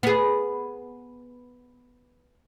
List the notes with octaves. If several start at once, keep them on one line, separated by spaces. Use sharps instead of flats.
B3 G#4